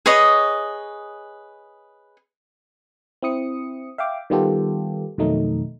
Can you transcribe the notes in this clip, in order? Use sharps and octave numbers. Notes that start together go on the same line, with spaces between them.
G#4 B4 C#5 D#5
C4 E4 D#6 C#7
E5 F5 G5 D6
D#3 G3 B3 F4 G4 A4
F2 B2 D#3 F#3 A3 D#4